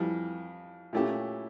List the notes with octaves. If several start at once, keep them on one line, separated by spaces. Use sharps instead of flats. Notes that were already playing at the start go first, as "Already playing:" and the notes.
Already playing: F2 E3 G3
A#2 A3 C#4 E4 G4